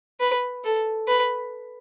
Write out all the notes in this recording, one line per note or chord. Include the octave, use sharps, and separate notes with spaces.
B4
A4
B4